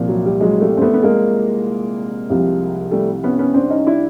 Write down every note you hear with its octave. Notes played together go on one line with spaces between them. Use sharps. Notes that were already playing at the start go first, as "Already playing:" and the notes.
Already playing: C2 A#2 F3
F#3
G3
F#3 G#3
G3 A3
C4
A3 B3
B3
G#3 A#3
C2 C3 F3
G3 A3
B3 C#4
B3 C#4
C4 D4
C#4 D#4
D4 E4